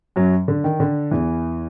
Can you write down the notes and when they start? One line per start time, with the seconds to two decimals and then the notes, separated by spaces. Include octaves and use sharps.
0.16 F#2 F#3
0.48 D3
0.64 D#3
0.80 D3
1.11 E2 E3